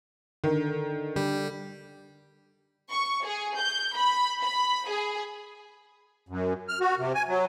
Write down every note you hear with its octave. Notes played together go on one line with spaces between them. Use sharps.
D3 D#3
D3 G3 G4
C#6
G#4
G6
B5
B5
G#4
F#2
F6
F#4
C3
G#5
F#3